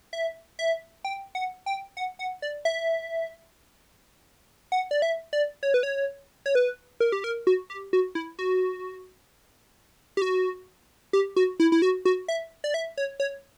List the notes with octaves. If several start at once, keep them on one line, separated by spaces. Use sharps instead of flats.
E5
E5
G5
F#5
G5
F#5
F#5
D5
E5
F#5
D5
E5
D5
C#5
B4
C#5
C#5
B4
A#4
G4
A#4
F#4
G4
F#4
E4
F#4
G4
F#4
G4
F#4
E4
E4
F#4
F#4
E5
D5
E5
C#5
C#5